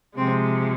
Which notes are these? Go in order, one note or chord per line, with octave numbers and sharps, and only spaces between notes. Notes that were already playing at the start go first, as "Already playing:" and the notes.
C3 F3 G#3 C4